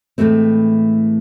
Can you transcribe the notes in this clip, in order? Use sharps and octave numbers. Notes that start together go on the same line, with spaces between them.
A2 E3 G#3 A3 C4